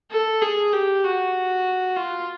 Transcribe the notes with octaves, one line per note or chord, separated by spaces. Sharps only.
A4
G#4
G4
F#4
F4